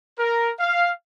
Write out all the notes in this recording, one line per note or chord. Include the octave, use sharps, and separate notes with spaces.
A#4
F5